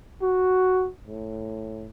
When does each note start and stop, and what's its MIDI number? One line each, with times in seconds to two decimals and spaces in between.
0.22 0.88 66
1.07 1.88 45